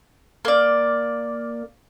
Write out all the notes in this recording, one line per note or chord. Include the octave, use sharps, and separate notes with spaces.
A#3 D5